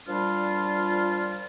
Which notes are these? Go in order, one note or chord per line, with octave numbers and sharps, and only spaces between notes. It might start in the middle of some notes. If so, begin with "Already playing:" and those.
A#2 F3 G3 D4 F4